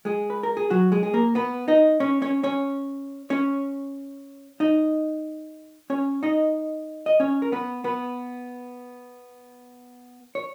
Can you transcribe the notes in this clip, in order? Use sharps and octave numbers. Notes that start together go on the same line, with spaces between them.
G#3 G#4
B4
A#4
G#4
F#3 F#4
G#3 G#4
G#4
A#3 A#4
B3 B4
D#4 D#5
C#4 C#5
C#4 C#5
C#4 C#5
C#4 C#5
D#4 D#5
C#4 C#5
D#4 D#5
D#5
C#4 C#5
A#4
B3 B4
B3 B4
C#5